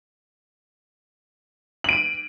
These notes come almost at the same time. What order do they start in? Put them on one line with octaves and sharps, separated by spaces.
F#7 D7 D#7